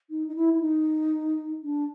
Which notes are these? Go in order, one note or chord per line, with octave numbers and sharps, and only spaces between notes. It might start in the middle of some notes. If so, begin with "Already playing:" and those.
D#4
D#4
E4
E4
D#4
D4